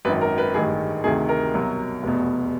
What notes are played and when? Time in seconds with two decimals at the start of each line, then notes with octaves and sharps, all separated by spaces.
0.05 G#1 F#2 D#3 B4
0.21 A#4
0.38 B4
0.54 A1 G2 D#3 G#3 G#4
1.04 D2 C3 D#3 G#4
1.29 A#4
1.54 C2 B2 F#3
2.03 F1 E2 B2